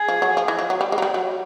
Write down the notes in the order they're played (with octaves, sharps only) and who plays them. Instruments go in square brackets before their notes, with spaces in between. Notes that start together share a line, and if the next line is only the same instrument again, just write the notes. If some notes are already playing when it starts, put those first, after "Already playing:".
Already playing: [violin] G#4
[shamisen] F3
F#3
F3
E3
F3
F#3
G3
G#3
F#3
G3
F#3